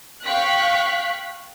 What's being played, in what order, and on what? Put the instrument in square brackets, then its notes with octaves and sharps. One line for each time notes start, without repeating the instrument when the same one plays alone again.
[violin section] F5 G5 C#6 F#6 B6